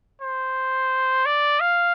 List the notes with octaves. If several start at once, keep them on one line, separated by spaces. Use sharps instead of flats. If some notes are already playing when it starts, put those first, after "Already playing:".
C5
D5
F5